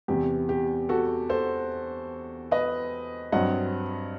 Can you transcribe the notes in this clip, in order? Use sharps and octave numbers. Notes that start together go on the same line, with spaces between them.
E2 C3 E3 G4
G4
F#4 A4
A4 C5
B4 D#5
G2 F#3 C4 D#5 F#5